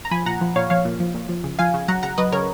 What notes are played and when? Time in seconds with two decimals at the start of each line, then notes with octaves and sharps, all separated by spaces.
0.05 A#5
0.11 F3 G#5 B5
0.26 A#2 F#5 A#5
0.41 F3
0.56 A#2 C#5 F5
0.70 F3 C#5 F5
0.85 A#2
1.00 F3
1.14 A#2
1.29 F3
1.44 C#3
1.59 F3 F5 G#5
1.74 C#3
1.88 F#3 F#5 A#5
2.03 C#3 F#5 A#5
2.18 F#3 B4 D#5
2.32 C#3 A#4 C#5